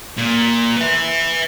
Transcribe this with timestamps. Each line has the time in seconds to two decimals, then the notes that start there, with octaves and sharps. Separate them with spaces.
0.17 A#2
0.76 B4 E5